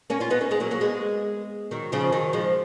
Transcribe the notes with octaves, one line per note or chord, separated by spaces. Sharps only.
A#3 C#4
C#4 F4
B3 D#4
A#3 C#4
G#3 B3
F#3 A#3
F#3 A#3
G#3 B3
D#3 F#3
C#3 F3
D#3 F#3
F3 G#3